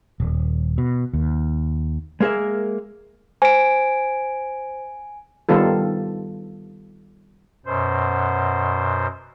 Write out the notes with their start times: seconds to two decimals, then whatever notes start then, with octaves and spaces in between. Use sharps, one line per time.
0.20 D#1
0.78 B2
1.13 D#2
2.20 G#3 A#3 G#4 A#4 E5
3.42 C5 G#5 D7
5.49 D#3 G3 B3 F4 A4
7.66 F#2 B2 C5